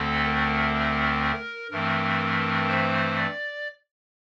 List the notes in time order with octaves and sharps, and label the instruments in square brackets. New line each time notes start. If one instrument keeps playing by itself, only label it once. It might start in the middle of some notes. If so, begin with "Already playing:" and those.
Already playing: [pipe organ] D2 D3 A3 C4 A4
A#4
A#4
G2 E3 A3 C4 A#4
C5
D5